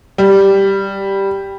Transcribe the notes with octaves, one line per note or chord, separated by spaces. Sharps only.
G3